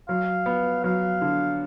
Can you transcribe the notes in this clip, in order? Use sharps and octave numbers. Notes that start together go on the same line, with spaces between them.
F#3 F5
B3
F#3 F5
D3